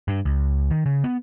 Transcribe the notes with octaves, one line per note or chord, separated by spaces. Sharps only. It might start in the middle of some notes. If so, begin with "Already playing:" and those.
G2
C#2
D#3
C#3
B3